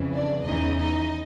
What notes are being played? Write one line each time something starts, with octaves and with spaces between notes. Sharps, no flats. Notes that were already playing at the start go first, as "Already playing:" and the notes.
Already playing: F2 C#3 E3
D4 D5
E2 C#3 E3 D#4 D#5
D#4 D#5